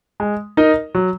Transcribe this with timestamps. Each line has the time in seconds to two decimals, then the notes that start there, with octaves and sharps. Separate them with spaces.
0.20 G#3
0.57 D#4 A#4 D#5
0.95 F#3